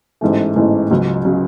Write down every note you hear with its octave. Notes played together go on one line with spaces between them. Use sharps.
A1 G#2 E3 A3
A1 G#2 E3 A3
C#2 C#3 F#3
C#3 F#3